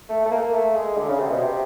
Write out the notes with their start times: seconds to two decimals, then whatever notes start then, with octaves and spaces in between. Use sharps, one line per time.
0.09 A3
0.25 A3
0.31 A#3
0.53 A3
0.76 G#3
0.97 D3
1.08 C#3
1.19 C3
1.30 B2
1.41 C3